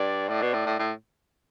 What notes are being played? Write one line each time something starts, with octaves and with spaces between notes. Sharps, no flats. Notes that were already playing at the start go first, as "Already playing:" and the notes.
Already playing: G2 D5
A2 D5
B2
A2
A2
A2